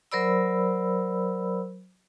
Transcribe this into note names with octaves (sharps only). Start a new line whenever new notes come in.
F#3 A#4 C5 D5 B5 E6